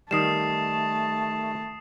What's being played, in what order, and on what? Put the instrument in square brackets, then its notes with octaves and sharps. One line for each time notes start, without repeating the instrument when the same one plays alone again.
[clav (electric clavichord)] D#3 G3 [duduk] A3 [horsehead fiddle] A5 [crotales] D#6 C7 E7